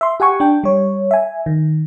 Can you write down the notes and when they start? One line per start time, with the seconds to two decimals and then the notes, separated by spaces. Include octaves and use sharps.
0.01 E5 C6
0.20 G4 F#5 G#5 C#6
0.40 D4 G5
0.64 G3 C#5
1.11 E5 G#5
1.46 D#3